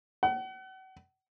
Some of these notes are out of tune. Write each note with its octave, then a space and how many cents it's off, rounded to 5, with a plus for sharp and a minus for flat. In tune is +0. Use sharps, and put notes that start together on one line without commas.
F#5 +40